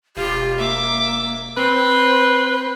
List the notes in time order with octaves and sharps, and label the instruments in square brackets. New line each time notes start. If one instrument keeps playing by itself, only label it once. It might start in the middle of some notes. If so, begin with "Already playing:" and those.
[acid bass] E1 [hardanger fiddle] F4 [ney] G4
[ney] A#3 [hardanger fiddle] E5 D6
[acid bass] C4 [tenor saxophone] B4 [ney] C5 [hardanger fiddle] C6